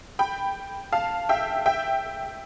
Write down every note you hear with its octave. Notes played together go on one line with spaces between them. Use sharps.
G5 B5
F5 A5
E5 G5
E5 G5